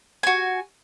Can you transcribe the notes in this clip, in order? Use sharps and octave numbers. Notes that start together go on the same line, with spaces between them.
F#4 G#5